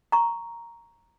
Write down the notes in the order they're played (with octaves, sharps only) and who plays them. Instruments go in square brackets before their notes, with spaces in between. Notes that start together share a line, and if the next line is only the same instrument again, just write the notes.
[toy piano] A#5 C#6